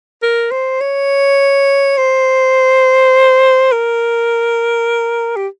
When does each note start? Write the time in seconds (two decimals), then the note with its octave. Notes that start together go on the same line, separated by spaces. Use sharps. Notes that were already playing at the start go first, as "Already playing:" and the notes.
0.22 A#4
0.51 C5
0.81 C#5
1.97 C5
3.72 A#4
5.36 G4